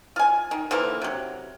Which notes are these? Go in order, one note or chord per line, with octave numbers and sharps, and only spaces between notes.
F4 G#5
D#3
D3 E3 F3 A#3
C3 F#3